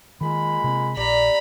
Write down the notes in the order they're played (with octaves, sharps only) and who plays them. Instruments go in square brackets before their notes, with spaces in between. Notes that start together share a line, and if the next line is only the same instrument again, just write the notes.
[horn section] A#2 G#3 B5 [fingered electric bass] D#3
[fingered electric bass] C3 B3 C4
[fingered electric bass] A#1 [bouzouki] G3 [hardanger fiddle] A#5 B5